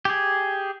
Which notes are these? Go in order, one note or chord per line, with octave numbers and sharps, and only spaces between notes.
G4 G#4